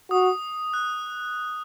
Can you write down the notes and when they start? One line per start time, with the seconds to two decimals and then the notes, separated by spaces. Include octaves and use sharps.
0.11 F#4 D#6
0.74 F#6